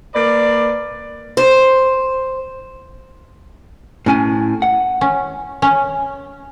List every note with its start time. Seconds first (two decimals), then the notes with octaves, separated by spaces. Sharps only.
0.15 A#3 B4 D5
1.37 C5
4.06 A2 C#4 G#5
4.62 F#5
5.01 C#4
5.62 C#4